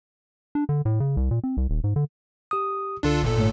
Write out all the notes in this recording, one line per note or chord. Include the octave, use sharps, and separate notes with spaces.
D4
D3
A2
C#3
C2
A#2
C4
C2
D#1
G#2
D3
G4 D#6
C#2 D3 D4 F4 A4
G1 A#2 A4
G#2 A3 C#5